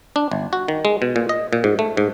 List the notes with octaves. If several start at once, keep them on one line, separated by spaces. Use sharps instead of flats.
D4
G1
F#4
D#3
G#3
B2
A#2
D#5
A#2
G#2
A3
G#2